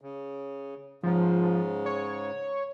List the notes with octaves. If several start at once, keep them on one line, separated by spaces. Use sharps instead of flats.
C#3
G#2 C#3 F3
C#5